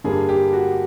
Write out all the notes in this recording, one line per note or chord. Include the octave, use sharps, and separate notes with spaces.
G2 D3 G3 A#3 G#4
G4
F#4